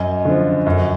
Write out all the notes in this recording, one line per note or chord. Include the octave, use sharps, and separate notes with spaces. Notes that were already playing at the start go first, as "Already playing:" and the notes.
Already playing: F#2 D#5
D3 F3
F#2